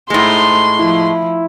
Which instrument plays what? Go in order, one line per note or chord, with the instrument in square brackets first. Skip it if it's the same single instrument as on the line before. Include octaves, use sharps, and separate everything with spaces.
[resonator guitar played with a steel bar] A2 G#3 [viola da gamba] A3 D#4 C5 [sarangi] C6
[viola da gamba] F3 [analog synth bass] E4